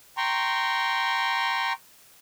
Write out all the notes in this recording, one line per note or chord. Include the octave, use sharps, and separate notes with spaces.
G5 A#5 C6 C#6